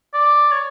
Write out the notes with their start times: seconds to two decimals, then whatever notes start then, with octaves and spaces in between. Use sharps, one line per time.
0.14 D5
0.52 C#5